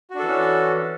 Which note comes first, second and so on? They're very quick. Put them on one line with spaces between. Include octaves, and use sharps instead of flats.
F#4 D4 A4 E3 C#4